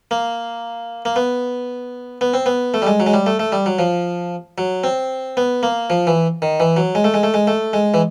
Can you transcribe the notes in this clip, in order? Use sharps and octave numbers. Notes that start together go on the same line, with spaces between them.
A#3
A#3
B3
B3
C4
B3
A3
G3
G#3
F#3
G#3
G3
A3
A3
G3
F#3
F3
F#3
C4
B3
A#3
F3
E3
D#3
E3
F#3
G#3
A3
G#3
A3
G#3
A3
G#3
E3